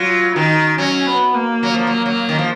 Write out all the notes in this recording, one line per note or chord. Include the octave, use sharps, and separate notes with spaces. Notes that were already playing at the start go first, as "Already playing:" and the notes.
Already playing: F#3 F4
D#3 D#4
F#3 C#4
B3
A#3
F#3
F3
F#3
F#3
D#3
F3